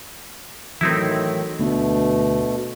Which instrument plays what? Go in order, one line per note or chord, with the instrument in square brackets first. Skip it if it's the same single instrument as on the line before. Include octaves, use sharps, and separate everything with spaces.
[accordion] A2 D#3 [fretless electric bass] E3 F#3 [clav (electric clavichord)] C4 D#4 E4
[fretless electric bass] D2 B3 D4 [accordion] B2 A3